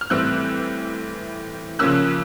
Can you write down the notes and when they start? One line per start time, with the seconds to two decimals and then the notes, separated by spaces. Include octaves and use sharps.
0.01 F6
0.10 A2 E3 G3 C4 E6 F#6
1.79 C#3 F3 A#3 C#4 E6 F#6